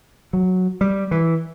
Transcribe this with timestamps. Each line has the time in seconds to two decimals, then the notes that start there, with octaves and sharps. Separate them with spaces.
0.33 F#3
0.81 G3
1.11 E3